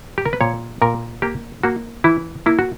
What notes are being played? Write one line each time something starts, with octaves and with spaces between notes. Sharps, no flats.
G4
A#4
B4
A#2 C#5
A#2 A#4
A#3 G4
A#3 F#4
E3 E4
A#3 E4
F#4